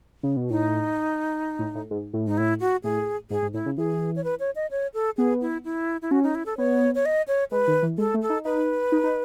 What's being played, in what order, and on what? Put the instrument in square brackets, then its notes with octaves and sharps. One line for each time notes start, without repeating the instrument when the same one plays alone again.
[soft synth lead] C#3
B2
[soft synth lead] A2 [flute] D#4
[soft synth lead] A2
A2
G#2
A2
[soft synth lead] G#2 [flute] D#4
[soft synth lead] A2 [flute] E4
[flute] F#4
[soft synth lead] A2 [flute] G#4
[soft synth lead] G#2 [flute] G#4
[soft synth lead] G#2
[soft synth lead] A2 [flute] E4
[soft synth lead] C#3
[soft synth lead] E3 [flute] G#4
[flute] C#5
B4
C#5
D#5
C#5
A4
[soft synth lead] B3 [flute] G#4
[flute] E4
E4
E4
[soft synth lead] C#4 [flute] F#4
[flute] D#4
E4
A4
[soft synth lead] B3 [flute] C#5
[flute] C#5
D#5
C#5
[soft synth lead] G#3 [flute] B4
[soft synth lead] D#3
E3
[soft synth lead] G#3 [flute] A4
[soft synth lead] A3
[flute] A4
[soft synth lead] D#4
[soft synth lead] D#4 [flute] B4
[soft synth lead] D#4
D#4